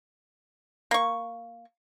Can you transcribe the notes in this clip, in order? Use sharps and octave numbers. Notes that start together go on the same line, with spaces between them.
A#3 C#6